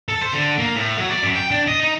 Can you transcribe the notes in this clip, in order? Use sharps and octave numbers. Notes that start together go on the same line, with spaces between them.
A4
C5
D3
A#3
A2
F#3
D5
F#2
G5
D4
D#5
D#4